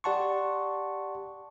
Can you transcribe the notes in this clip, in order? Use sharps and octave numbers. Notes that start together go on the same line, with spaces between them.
G4 D5 F#5 A5 C6 C#6